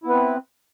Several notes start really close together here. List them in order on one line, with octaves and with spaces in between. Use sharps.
E4 B3 B4 C4